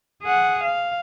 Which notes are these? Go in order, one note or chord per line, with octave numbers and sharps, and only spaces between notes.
G#4 F#5
F5